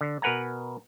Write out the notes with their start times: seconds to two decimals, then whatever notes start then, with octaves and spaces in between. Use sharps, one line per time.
0.01 D3
0.22 B2 A#4 B4 F#5 G#5 A#5